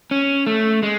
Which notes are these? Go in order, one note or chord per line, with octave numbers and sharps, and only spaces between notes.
C#4
A3
G#3